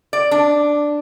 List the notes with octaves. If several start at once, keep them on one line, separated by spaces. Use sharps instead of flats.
D5
D4